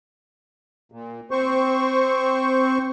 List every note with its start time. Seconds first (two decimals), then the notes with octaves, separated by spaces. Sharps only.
0.92 A#2
1.31 C4 C5 C#6